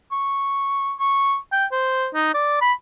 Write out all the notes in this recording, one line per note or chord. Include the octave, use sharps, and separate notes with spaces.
C#6
C#6
G5
C5
D#4
D5
B5